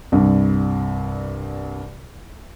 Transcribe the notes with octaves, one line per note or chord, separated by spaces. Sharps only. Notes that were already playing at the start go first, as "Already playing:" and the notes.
C2 G2